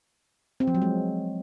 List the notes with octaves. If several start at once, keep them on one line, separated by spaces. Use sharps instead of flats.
C4
F3
F#3
G#3